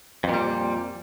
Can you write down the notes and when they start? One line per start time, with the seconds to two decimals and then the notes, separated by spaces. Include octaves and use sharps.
0.24 F2
0.29 A#2
0.34 G3